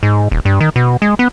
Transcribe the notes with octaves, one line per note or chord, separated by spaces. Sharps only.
G#2
D#1
G2
D#3
B2
G#3
B3